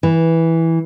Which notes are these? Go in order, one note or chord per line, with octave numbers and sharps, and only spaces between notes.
E3